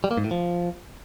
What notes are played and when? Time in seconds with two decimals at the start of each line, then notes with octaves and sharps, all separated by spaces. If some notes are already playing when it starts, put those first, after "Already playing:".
0.04 G3
0.11 A#3
0.17 G#2
0.24 A2
0.31 F3